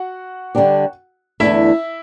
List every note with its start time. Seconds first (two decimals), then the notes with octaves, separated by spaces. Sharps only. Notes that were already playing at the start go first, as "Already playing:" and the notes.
Already playing: F#4 F#5
0.55 D3 G3 D4 G4
1.40 E2 D3 A3 E4 E5